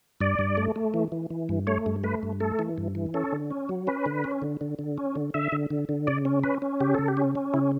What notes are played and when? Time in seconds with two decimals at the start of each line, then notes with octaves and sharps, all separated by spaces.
0.21 G2 D5
0.39 G2
0.57 A3
0.76 A3
0.94 E3
1.12 E3
1.30 E3
1.49 G2
1.67 A3 C#5
1.86 G2
2.04 A3 B4
2.23 G2
2.40 A3 A4
2.59 E3
2.78 G2
2.95 E3
3.14 C#4 A4
3.32 D3
3.50 C#4
3.69 F#3
3.87 C#4 B4
4.06 D3
4.24 C#4
4.42 D3
4.61 D3
4.79 D3
4.98 C#4
5.15 D3
5.34 D3 E5
5.52 D3
5.70 D3
5.89 D3
6.07 C#3 D5
6.25 C#4
6.43 C#4 B4
6.62 C#4
6.80 C#3 G4
6.95 C#3 A4
7.08 G4
7.17 C#4
7.35 C#4
7.54 C#3 E4